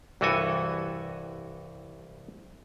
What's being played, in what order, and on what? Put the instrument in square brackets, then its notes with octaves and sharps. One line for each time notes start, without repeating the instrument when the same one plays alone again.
[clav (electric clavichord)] C2 G2 E3 F#4 A4 G#5